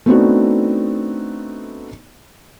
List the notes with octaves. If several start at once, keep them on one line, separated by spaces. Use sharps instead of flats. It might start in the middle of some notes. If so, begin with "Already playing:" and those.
A3 B3 C4 D4 D#4 F#4